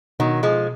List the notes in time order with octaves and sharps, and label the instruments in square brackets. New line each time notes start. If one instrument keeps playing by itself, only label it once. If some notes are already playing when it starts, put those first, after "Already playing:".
[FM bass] B2 [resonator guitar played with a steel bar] D#3 F#3
[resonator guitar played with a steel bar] F3 G#3